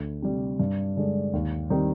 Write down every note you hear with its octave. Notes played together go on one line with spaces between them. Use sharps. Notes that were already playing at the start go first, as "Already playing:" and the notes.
Already playing: D2
C3 G3
G2
D3 G#3 D4
D#2
D#3 G3 C4 D#4